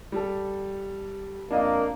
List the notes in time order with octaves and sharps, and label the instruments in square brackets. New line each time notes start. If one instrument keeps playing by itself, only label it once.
[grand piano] G3 A4
[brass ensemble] F2 A#3 [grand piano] D4 D#5